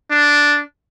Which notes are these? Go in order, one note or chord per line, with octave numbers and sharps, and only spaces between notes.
D4